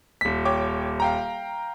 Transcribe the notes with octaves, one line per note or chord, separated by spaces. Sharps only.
D#1 B6
C#5 G5 D6
F5 G5 A#5